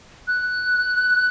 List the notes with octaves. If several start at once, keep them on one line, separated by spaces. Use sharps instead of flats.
F#6